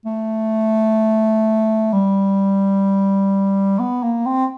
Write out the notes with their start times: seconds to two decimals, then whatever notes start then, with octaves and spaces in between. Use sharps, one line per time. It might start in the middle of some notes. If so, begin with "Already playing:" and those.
0.06 A3
1.93 G3
3.79 B3
4.02 A#3
4.26 C4